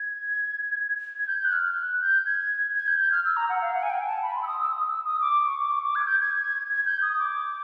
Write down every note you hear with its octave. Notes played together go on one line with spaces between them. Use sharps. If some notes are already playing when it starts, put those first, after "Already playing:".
Already playing: G#6
G#6
G6
F#6
F6
F#6
G6
G#6
G#6
G6
G6
F6
E6
A#5
F#5
F5
F#5
G#5
G5
A5
B5
C6
E6
D#6
E6
D#6
E6
D#6
D6
C#6
D6
C#6
D6
G#6
G6
G#6
G#6
G6
D#6
D6